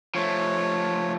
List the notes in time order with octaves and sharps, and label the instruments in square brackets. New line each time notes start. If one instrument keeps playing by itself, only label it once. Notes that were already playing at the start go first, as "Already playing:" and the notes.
[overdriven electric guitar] F3 A3 [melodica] C#5